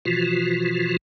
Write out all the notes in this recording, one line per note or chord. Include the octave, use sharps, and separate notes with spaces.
B2 E3 F3 F4 F#4